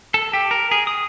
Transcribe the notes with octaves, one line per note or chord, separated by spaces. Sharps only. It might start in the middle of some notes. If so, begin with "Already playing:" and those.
A4
G4
A#4
G#4
D#6